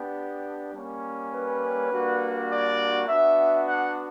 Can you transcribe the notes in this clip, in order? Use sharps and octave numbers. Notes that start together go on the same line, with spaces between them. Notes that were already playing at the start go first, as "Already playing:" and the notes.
Already playing: B3 D4 G4
G3 A#3 C#4
B4
G3 A#3 D4 F#4
D5
B3 D4 F#4 E5
F#5